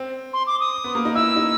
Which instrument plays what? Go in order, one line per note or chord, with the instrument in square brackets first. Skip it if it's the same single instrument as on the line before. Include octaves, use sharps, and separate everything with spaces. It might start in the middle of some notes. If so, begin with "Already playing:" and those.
Already playing: [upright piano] C4
[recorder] C6
D6
D#6
[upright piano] B3
A#3
D#4
[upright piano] E4 [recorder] E6
[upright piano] D#4